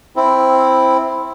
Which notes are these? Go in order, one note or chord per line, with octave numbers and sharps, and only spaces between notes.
C4 E4